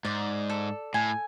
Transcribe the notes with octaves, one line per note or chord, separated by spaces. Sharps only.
G#2 D5
A4
A2 G#5